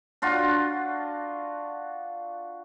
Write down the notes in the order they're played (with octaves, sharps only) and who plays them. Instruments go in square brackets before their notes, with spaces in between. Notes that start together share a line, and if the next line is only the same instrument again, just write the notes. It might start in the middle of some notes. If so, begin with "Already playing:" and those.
[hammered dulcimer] D4 F4 F#4